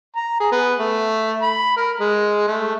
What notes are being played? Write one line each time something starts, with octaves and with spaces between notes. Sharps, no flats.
A#5
G#4
B3
A3
B5
A#4
G#3
A3